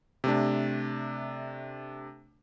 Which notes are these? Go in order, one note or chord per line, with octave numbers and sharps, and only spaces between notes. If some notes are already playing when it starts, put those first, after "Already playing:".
C3 A3 D4